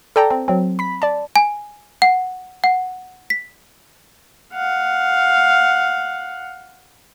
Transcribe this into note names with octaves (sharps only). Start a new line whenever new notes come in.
A4 D5 G5 A5 A#5
C4
F#3 C4
B5 B6
D5 A5
G#5
F#5
F#5
B6
F5 F#5